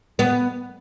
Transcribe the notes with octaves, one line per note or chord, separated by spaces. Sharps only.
B3